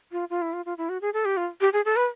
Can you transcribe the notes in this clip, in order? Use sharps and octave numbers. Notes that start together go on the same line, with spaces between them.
F4
F4
E4
F4
F4
E4
F#4
G#4
A4
G4
F4
G4
G#4
A4
B4